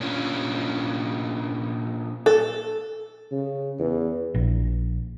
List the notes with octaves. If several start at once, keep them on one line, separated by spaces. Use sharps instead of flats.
A#2 C#4 D4 F4
A4
C#3
E2
A#1